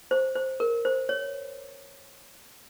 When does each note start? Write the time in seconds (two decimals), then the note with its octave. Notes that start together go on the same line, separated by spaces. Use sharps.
0.11 C5
0.36 C5
0.60 A#4
0.85 C5
1.09 C#5